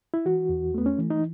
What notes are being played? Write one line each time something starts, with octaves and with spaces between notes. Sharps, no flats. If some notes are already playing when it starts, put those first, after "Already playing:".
E4
E3 F#4
E2
A3 B3
C#4
E3
D#4